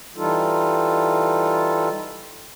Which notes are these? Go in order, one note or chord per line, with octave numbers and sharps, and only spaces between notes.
E3 G3 D#4 F4 A4